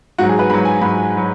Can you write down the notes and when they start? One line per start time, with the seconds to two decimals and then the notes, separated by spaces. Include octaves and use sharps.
0.18 G#2 F#3 F#4
0.29 G#4
0.39 B4
0.50 G#2 F#3 B5
0.65 G#5
0.81 G#2 F#3 B5
1.17 F#3